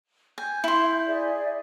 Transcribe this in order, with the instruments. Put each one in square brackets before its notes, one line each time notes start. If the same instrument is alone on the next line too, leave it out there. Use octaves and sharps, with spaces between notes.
[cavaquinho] G#5 [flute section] G6
[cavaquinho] E4 C6
[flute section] G#4 D5 E5